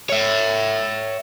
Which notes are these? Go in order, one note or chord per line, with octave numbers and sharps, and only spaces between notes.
C#5 E5